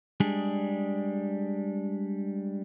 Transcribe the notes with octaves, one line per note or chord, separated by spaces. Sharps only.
G3 G#3 D4 G#4